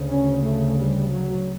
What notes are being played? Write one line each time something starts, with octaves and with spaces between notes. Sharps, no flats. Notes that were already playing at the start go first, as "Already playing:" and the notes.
Already playing: D2 C#3
C#4
A3
G3
F#3